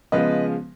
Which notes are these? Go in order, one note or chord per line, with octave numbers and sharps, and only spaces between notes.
C#3 F3 G#3 B3 B4 D#5